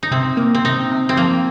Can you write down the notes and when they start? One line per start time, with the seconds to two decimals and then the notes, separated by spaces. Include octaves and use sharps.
0.03 D#4
0.11 C3 C4
0.37 A#3
0.55 C4
0.65 C3 D#4
0.91 C3
1.09 C4
1.17 F3 A#3